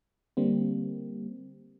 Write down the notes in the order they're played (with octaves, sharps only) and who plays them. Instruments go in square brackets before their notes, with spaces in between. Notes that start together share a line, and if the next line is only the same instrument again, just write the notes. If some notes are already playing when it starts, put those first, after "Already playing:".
[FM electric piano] D3 G3 A#3 C4